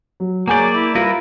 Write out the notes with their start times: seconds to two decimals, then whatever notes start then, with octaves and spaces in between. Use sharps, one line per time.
0.20 F#3
0.48 F#3 A#3 G#4 D5 G#5 G6
0.75 E4
0.95 G3 F4 A#4 B4